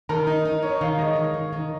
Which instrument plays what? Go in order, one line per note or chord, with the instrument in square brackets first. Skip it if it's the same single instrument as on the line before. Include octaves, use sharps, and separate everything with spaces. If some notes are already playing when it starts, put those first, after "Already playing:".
[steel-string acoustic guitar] D#3 [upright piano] A#4
[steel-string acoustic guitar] D#4
D#4
[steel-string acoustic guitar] D#4 [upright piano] C#5
[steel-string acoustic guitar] D#3 [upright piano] F5
[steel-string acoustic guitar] G#3 [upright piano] D#5
[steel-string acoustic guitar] D#3
D#3
D#3